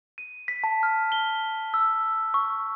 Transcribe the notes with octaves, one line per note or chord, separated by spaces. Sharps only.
D#7
B6
A5
F6
G7
E6
C#6